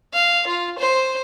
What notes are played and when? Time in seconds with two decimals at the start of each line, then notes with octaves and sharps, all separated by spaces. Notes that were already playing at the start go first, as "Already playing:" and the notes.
0.14 F5
0.48 F4
0.79 C5